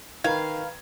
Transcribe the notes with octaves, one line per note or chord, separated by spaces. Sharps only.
D#3 B4 F5 A#5 B5 G#6